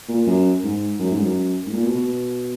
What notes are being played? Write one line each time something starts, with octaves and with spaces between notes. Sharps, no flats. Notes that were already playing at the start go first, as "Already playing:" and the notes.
A#2
F#2
G#2
F#2
G#2
F#2
G#2
A#2
B2
B2